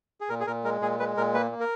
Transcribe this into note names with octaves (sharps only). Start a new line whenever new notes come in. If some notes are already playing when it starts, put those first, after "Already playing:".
G#4
A#2 A#4
G#4
A#2 A#4
G#3 A#4
A#2 G#4
G#3 B4
A#2 A#4
A#3 B4
A#3
A#4